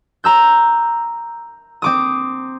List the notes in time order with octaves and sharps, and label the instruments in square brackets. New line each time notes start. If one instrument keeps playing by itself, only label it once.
[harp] A#5 E6 G6
C4 D6 D#6